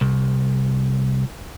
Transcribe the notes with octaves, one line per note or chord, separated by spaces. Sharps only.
C2